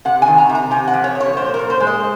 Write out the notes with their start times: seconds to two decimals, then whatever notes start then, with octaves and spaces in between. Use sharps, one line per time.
0.05 C3 F#5
0.22 G#5
0.28 D#3
0.38 A#5
0.49 C3
0.55 A#5
0.71 C3 G#5
0.88 F#5
0.93 F3
1.04 C#5
1.15 F3
1.20 C#5
1.37 A#2 C5
1.54 A#4
1.59 A#2
1.70 C5
1.80 G#3
1.87 D#5